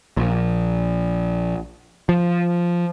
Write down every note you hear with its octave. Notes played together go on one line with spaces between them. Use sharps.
A#1
F3